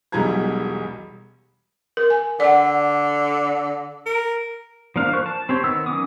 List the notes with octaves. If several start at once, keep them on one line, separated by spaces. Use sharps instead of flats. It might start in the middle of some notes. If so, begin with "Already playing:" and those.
E1 B1 G3 A#5 G#6
A#4
G#5
D3 D5 F#5
A#4
F3 A#3 D4 F5
F3 A#4 C5 C#6 F#6
A5
C4 G4 C#5
D#3 B3 E6
D#3 F#3 C#4 D6 D#6